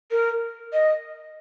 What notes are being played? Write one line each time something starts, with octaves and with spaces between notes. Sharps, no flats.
A#4
D#5